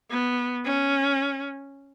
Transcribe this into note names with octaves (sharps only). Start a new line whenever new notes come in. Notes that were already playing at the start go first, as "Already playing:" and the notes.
B3
C#4